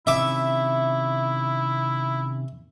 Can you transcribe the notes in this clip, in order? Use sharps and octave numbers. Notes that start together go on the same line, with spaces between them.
C3 D#3 C#4 E4 E5 D6